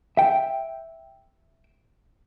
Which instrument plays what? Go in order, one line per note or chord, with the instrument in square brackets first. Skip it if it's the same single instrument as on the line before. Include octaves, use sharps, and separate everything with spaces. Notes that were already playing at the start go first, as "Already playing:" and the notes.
[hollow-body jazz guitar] E5 G5